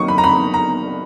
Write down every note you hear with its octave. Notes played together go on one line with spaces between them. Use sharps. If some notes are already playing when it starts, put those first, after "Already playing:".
Already playing: D#3 F#3 A#3 D#4 C#6 D#6
B5
A#5
B5
A#5